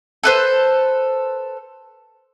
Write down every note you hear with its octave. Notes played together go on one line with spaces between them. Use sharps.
A4 B4 C5